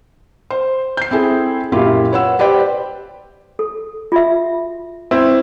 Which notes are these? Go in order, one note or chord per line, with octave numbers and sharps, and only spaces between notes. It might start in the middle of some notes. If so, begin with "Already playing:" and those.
C5
G6 C7
C4 E4 G#4 A4
F#2 A#2 E4 F4 G4
B4 C#5 F#5 E6
G4 B4 C5 D5 G5
A4
F4 F#4 E5
C4 E4